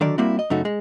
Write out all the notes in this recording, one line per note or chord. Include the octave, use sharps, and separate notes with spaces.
D3 D#3 F#3 D5
G3 A#3 C4 E4 F#4
D#5
F#2 C#3 A3 D#4 F#4
G#3